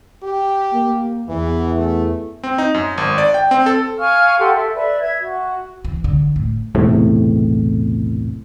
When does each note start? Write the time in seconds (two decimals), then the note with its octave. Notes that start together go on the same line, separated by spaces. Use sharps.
0.23 G4
0.74 A#3
1.29 E2 E3
1.77 A3
2.44 C4
2.58 D#4
2.74 F#2
2.98 G#1
3.18 D5
3.34 G5
3.51 C4
3.66 A4
3.98 F5 G#5 C#6 F6
4.39 G4 A4 F#5 C6
4.55 A4 E5
4.75 B4 D5 E5
5.01 E5 G#6
5.21 F#4
5.84 E3
6.04 D3
6.36 A2
6.75 B1 E2 A2 C3